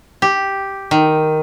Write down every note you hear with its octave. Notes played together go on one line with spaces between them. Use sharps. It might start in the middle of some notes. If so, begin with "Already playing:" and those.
G4
D#3